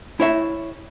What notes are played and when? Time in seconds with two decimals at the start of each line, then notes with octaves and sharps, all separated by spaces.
0.20 E4 C#5 E5